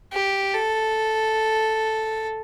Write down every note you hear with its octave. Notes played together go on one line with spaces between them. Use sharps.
G4
A4